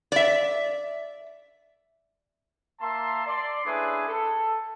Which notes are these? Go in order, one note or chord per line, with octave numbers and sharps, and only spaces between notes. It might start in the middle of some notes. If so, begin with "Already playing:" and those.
D5 E5
A#3 E5 A5 A#5 C6
D5 C6
A3 C#4 D4 E4 G#4 B4
A4